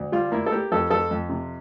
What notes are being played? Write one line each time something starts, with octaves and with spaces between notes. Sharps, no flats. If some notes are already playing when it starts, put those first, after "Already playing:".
Already playing: D2
G3 F4
A#3 E4
A4
A#3 G4
F2 A4
F2 A4
F2
C3